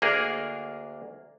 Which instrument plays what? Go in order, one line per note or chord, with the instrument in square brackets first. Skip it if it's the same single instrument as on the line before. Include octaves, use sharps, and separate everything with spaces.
[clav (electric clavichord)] D2 A#3 D4 G#4 A#4